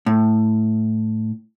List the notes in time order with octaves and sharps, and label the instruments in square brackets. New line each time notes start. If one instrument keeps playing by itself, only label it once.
[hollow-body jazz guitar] A2